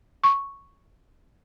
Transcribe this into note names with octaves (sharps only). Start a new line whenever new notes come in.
C#6